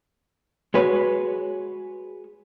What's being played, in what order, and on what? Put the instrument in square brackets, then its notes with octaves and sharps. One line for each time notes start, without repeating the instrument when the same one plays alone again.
[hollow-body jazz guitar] G#3 F#4 B4 C#5